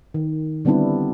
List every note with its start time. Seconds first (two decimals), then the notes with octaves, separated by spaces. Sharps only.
0.14 D#3
0.65 D3 G3 B3 C4 D4 E4